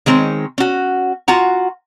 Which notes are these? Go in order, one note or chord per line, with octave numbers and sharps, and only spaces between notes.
D#3 G#3 C4 C#5
C#4 F#4
F4 F#4 F#5 A#5